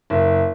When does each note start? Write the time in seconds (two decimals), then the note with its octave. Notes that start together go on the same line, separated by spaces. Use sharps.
0.10 F#1